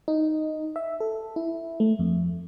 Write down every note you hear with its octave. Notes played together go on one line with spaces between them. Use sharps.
D#4
E5
A4
E4
A3
F2